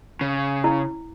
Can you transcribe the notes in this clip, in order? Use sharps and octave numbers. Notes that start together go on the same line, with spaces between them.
C#3
E4